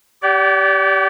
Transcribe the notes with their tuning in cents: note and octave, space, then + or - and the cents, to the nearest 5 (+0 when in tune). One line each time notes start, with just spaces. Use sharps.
G4 -5 D5 -30 F#5 +45